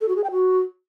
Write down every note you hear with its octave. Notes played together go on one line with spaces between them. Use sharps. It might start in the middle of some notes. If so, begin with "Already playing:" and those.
A4
F#4
G#4
G5
F#4